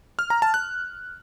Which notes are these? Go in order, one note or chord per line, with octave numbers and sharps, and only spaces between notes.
F6
A#5
A5
F#6